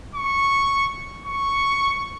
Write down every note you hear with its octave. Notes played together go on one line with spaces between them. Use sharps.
C#6
C#6